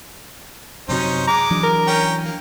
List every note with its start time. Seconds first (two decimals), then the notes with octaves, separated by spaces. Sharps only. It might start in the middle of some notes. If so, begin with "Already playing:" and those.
0.89 F#2 C3 F#3 C#4 D#4 C5
1.27 G#3 A#5 D6
1.51 E3 F#3 D4
1.63 A#4
1.87 C#4 G5 A#5
2.24 A#3